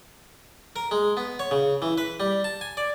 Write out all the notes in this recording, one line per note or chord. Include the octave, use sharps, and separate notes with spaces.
A#4
G#3
B3
C#5
C#3
E3
B4
G3
A5
G#5
D5